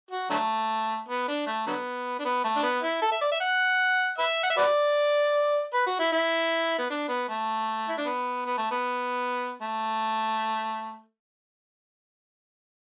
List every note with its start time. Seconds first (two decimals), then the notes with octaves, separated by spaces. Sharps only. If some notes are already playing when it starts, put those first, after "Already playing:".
0.11 F#4
0.30 D3 F#3 A3
1.08 B3
1.28 D4
1.46 A3
1.66 D3 F#3 B3
2.19 D4
2.25 B3
2.44 A3
2.56 D4
2.63 B3
2.83 E4
3.02 A4
3.12 E5
3.21 D5
3.32 E5
3.40 F#5
4.18 B4 E5
4.43 F#5
4.50 E5
4.57 F#4 B4 D5
5.74 B4
5.86 F#4
5.99 E4
6.12 E4
6.78 B3
6.90 D4
7.09 B3
7.29 A3
7.88 E4
7.98 D4
8.06 B3
8.45 B3
8.57 A3
8.71 B3
9.61 A3